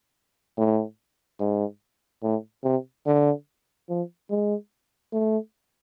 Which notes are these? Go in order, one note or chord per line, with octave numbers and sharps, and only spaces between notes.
A2
G#2
A2
C3
D3
F3
G#3
A3